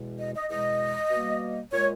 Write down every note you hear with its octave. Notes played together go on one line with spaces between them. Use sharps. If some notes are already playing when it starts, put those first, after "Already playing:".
Already playing: E2 B2 G#3
D#5
D#5
E2 B2 G#3 D#5
B2 G3 A#3
A#2 G#3 C#5